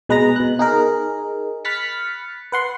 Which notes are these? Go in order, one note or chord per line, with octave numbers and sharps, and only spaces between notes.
B2 G#3 B4 D#5 A#5 A#6
B2 F#6
D#4 G#4 A#4
B5 F6 F#6 A6 B6 C#7
B4 F#5 C6